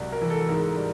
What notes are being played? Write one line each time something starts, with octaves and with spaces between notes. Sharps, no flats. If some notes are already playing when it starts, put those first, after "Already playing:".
Already playing: C2 F#3
A#4
E3
A4
G#2 A#4
G3